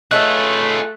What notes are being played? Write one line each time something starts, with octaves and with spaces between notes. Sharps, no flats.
A3 D#4 F4 G#4 B4 C#5 F#6